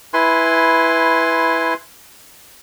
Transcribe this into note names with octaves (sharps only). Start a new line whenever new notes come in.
E4 B4 G#5 C6